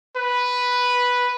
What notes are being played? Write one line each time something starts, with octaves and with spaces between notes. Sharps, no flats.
B4